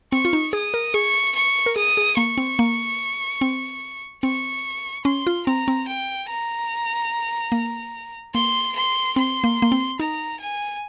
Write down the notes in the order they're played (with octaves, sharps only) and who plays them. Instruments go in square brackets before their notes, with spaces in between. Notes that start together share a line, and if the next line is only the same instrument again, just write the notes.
[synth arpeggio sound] C4 [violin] C#6
[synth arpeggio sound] F4
D#4
[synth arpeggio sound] G#4 [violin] D#6
[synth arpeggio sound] A#4
[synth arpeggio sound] G#4 [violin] C#6
[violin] C#6
[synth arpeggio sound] A#4
[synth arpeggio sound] G#4 [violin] D#6
[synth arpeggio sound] G#4
[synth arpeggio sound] A#3 [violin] C#6
[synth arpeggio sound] C4
A#3
C4
[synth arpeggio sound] C4 [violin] C#6
[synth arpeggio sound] C#4 [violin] C6
[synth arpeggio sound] F4
[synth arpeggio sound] C4 [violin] A#5
[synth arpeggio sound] C4
[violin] G5
A#5
[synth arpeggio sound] A#3
[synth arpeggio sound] A#3 [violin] C6
[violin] C6
[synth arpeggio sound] C4 [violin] C6
[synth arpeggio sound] A#3
A#3
C4
[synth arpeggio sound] D#4 [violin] A#5
[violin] G#5